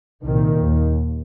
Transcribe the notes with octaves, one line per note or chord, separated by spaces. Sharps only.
C2 A#2 D#3
D#2